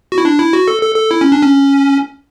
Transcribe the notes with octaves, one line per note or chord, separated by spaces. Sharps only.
F#4
E4
D4
E4
F#4
A4
A4
A4
E4
C#4
D4
C#4